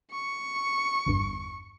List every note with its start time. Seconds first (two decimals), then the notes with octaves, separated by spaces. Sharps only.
0.11 C#6
1.06 G1 E2 G2